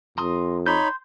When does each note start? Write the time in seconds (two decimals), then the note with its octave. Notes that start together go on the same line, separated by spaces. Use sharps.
0.18 F2 A#5 C6 D#6
0.66 D#4 C#5 B5 C6 G6